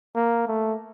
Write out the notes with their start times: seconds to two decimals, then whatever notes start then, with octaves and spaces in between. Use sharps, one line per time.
0.16 A#3
0.47 A3